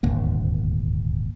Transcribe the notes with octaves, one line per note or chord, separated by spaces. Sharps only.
D#1 G#1 D2 A#3